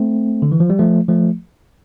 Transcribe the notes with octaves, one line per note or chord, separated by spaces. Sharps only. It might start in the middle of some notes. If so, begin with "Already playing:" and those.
Already playing: A3 C4
D3
E3
F3
G3
F3 A3
F3 A3